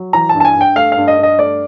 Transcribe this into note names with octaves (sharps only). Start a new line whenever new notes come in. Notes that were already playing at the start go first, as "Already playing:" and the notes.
Already playing: F#3
E3 A#5
A5
G2
A5
G#5
G2
G5
A3 F5
F5
G2
D#5
G2
D#5
A3 D5